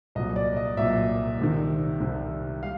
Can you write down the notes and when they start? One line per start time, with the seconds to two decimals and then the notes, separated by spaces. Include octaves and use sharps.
0.15 C2 A#2 F#3 D#5
0.36 D5
0.56 D#5
0.77 C2 A#2 F#3 E5
1.39 C2 C3 D#3
2.00 C2 C3 D#3
2.63 G3 F5